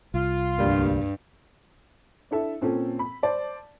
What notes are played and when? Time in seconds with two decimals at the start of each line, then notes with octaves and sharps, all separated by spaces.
0.14 C2 F4
0.59 D2 G2 G3 A#3
2.31 D4 E4 A4 E5
2.61 A#2 C4 C#4 A4
2.99 B5
3.23 C5 D5 A5